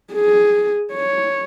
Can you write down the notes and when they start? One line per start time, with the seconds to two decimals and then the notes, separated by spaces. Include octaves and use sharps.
0.13 G#4
0.94 C#5